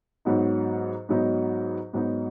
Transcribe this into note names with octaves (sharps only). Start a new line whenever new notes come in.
G#2 F#3 B3 D#4
G#2 F#3 B3 D#4
G#2 F#3 B3 D#4